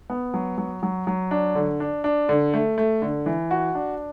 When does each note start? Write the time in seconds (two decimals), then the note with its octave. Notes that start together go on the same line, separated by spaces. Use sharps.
0.10 B3
0.34 F#3
0.58 F#3
0.83 F#3
1.07 F#3
1.31 D4
1.55 D3
1.80 D4
2.04 D4
2.29 D3
2.54 A3
2.78 A3
3.02 D3
3.26 E3
3.51 F#4
3.75 D4